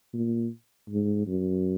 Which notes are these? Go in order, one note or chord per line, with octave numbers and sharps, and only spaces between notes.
A#2
G#2
F#2